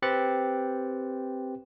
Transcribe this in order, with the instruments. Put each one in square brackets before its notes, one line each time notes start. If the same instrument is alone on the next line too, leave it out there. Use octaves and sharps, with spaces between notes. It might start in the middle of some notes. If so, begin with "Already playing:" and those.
[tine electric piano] C4 G4 B4 F#6 A6 C#7